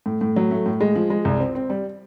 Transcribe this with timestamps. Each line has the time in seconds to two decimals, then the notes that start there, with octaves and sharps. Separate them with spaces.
0.06 A2
0.21 A2
0.36 F#3
0.51 A3
0.66 A2
0.81 G#3
0.96 F3
1.10 G#3
1.25 C2
1.40 C4
1.55 C4
1.70 G3